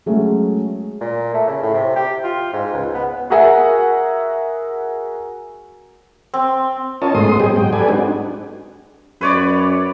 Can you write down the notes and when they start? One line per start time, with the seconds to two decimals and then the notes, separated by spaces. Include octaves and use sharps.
0.06 F#3 G#3 A3 C#4
1.01 A#2
1.34 A3
1.47 C#3
1.62 A2
1.74 C3
1.96 G4
2.24 F4
2.53 G#2
2.73 C#2
2.94 B3
3.30 F#4 G#4 A#4 E5 F#5 G#5
6.34 C4
7.02 C#4 F4 A#4 C#5 D#5 A5
7.15 G#2 G#3 A3 B3 C6 D#6
7.40 G3 C4 G4 G#4 D#5
7.56 G#2 F#3 G5
7.73 G4 A4 B4 D5 G#5
7.89 G#3 C4 D4 D#4 F#4
9.21 F#2 B4 C#5 D5